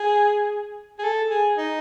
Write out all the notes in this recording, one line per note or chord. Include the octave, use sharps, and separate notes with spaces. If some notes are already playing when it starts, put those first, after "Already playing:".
Already playing: G#4
G#4
A4
G#4
D#4